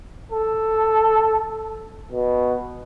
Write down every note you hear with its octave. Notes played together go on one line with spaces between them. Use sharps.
A4
B2